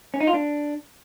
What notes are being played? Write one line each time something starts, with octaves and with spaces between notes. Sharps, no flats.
C#4
D#4
F4
D4